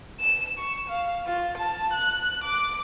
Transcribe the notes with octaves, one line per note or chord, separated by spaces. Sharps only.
E7
C#6
F5
F4
A5
F#6
D6